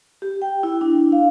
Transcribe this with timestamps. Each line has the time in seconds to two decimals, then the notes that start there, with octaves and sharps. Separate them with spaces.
0.22 G4
0.42 G5
0.63 E4
0.81 D4
1.12 F5